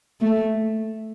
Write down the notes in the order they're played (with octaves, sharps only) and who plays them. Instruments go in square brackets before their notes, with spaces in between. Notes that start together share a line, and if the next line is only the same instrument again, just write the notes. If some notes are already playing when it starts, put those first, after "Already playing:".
[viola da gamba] A3